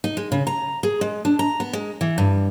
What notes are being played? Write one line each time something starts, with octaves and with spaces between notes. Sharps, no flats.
D#4
G#3
C#3
A#5
G#4
G#3
D4
A#5
B3
G#3
E3
G2